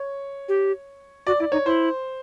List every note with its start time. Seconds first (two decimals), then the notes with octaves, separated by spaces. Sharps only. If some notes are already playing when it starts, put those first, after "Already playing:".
Already playing: C#5
0.48 G4
1.27 F#4 D5
1.40 E4 D5
1.52 D#4 C#5
1.66 E4 C5